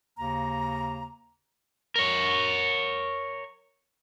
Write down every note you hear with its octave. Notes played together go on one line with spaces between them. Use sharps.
D#2 C#3 A#3 A#5
A#4 C#5